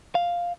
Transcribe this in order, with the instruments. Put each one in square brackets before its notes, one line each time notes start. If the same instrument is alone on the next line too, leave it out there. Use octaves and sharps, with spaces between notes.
[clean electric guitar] F5